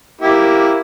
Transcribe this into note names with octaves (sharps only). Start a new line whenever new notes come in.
A#3 E4 G4